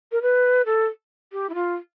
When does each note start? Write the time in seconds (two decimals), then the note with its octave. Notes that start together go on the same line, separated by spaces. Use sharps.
0.12 A#4
0.22 B4
0.65 A4
1.32 G4
1.49 E4
1.54 F4